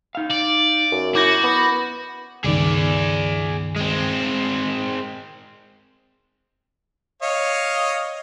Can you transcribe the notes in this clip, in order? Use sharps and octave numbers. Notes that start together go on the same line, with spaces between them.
D#4 F5
D5
F#2
E4 F#4 D6 G6 A#6
B3
C#2 G2 D#3 G#4 D5
G#3 C4
C#5 D#5 F5